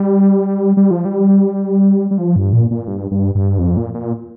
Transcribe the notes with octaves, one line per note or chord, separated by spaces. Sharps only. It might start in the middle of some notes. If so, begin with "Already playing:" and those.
Already playing: G3
G3
F3
G3
G3
F3
G2
A#2
A#2
G2
G2
G2
F2
A#2
A#2